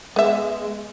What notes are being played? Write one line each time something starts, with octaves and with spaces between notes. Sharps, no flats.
G#3 B3 E5